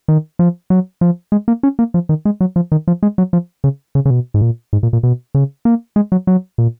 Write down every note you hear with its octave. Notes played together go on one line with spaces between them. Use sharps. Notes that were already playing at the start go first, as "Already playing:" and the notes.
D#3
F3
F#3
F3
G#3
A#3
C#4
A#3
F3
D#3
G#3
F#3
F3
D#3
F3
G#3
F#3
F3
C#3
C#3
C#3
B2
G#2
A#2
G#2
A#2
A#2
B2
C#3
A#3
G#3
F#3
F#3
A#2